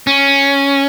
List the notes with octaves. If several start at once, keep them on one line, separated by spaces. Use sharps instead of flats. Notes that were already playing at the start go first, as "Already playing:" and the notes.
C#4